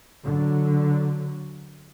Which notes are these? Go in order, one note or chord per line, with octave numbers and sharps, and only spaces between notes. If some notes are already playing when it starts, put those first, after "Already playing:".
D3 F#3